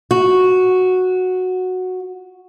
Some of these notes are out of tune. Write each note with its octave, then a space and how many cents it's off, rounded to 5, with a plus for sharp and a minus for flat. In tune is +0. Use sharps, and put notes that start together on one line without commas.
F#4 -5